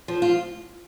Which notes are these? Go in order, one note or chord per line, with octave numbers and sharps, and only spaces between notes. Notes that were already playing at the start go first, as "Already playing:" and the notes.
F3
F4